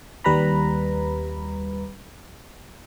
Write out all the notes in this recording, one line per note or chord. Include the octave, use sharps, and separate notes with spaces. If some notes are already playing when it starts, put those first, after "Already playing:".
D#2 G3 B4 A#5 B5